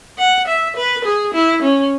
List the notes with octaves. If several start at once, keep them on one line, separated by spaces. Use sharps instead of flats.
F#5
E5
B4
G#4
E4
C#4